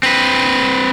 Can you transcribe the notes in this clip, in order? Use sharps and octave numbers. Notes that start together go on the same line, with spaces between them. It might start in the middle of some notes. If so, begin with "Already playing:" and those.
C4 B4